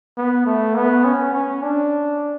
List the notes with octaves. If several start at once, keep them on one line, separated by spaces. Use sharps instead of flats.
B3
A3
B3
C#4
C#4
D4